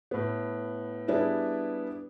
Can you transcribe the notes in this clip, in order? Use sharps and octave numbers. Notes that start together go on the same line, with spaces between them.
A2 B3
G3 B3 D4 E4 G#4